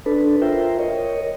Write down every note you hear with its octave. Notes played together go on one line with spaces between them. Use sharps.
D4 A4 B4
F4 A#4 C5 E5 G5
A#4 C#5 D#5